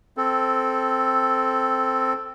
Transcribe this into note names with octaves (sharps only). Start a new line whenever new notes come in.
C4 A4